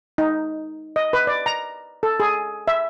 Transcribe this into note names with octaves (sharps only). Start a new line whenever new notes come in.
D#4
D#5
B4
D5
A#5
A4
G#4
E5